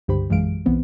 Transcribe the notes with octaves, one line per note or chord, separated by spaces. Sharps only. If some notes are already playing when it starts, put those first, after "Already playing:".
C#2 G2 D3 G4 C5 B5
A#1 F#2 E3 G#3 F5 D7
B1 E3 B3 C4